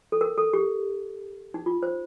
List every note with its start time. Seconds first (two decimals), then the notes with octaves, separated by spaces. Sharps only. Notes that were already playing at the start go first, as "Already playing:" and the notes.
0.12 A4
0.21 A#4
0.38 A4
0.53 G4
1.54 D#4
1.66 F4
1.83 C5